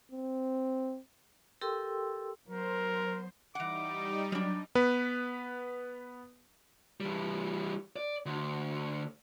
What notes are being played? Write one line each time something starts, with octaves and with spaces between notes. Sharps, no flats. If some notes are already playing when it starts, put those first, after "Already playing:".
C4
G4 A4 A#4 G5 C6 E6
F#3 B3 A#4 C5
E3 G3 D#4 F#5 D6
F#3 G3 D4
B3 B4
E3 G3
D5
D2